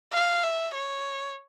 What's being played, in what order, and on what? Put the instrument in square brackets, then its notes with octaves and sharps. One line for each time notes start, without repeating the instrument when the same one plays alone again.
[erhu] F5
E5
C#5